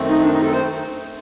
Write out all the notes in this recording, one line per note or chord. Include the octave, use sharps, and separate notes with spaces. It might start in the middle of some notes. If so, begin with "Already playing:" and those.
Already playing: F#2 D#3 A3 C4
D#4
D4
D#4
A4
C5